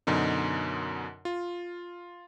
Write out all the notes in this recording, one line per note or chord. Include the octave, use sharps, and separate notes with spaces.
F#2 B2 D3 D#4
F4